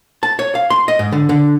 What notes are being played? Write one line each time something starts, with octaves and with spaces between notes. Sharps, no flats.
A5
C#5
F5
C6
D#5
G#2
D3
D3